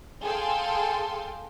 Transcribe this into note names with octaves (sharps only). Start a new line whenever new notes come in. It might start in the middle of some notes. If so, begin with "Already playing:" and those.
G#4 A4 F5 G5 C6